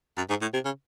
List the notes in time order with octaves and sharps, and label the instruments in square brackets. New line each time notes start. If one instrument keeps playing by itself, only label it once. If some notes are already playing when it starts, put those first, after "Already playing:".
[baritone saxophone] F#2
G#2
A2
C3
C#3